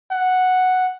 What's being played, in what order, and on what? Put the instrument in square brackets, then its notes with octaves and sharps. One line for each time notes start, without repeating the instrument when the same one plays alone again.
[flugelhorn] F#5